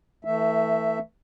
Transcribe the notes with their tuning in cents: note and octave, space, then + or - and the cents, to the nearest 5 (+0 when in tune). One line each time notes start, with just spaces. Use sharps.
E3 -15 A3 +20 E5 +0